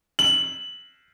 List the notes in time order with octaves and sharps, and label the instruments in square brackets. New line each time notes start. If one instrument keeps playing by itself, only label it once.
[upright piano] F#7